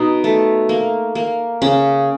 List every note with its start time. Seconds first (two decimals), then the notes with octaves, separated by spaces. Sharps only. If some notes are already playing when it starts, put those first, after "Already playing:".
Already playing: B2 D#4
0.24 A3
0.69 A#3
1.15 A#3
1.62 C#3 C#4